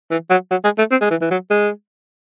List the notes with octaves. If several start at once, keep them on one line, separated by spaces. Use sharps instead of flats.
E3
F#3
F#3
G#3
A3
C4
G#3
E3
E3
F#3
G#3